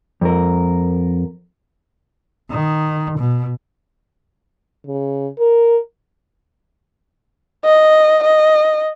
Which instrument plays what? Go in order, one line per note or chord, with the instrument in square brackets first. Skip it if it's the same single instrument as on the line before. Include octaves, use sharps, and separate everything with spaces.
[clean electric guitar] F2 A#4
[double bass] D#3
B2
[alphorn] C#3
A#4
[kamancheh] D#5
D#5